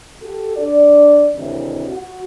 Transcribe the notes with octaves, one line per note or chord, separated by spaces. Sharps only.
F#4 G4 A4
D4 D5
D2 A2 C3 D#3 E3
F#4